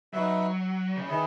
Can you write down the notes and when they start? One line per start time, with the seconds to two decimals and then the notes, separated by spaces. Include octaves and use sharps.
0.13 F#3 D#4 F#4 B4 E5
0.96 C#3
1.08 D#3 E4 G#4 B4